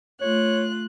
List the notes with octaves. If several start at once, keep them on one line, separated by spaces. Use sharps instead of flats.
A3 F4 C#5 F#6